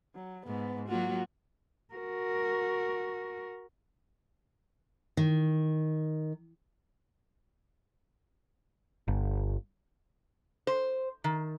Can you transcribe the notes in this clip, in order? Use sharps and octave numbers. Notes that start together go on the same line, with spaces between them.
F#3
G#2 B3
F#3 A#3 F4 F#4
F#4 A#4
D#3
G1
C5
D#3